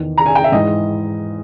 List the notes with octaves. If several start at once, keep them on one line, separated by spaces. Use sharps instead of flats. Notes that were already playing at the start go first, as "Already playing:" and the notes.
Already playing: E2 D#3
A#5
G#5
G5
E5
G#2 E3 D#5